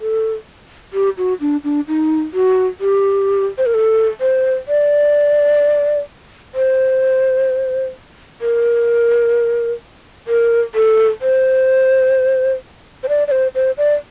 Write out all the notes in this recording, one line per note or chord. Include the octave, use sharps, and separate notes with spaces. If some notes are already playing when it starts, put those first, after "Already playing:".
A4
G4
F#4
D4
D4
D#4
F#4
G4
C5
A#4
A4
C5
D5
C5
A#4
A#4
A4
C5
C5
D5
D5
C5
C5
D5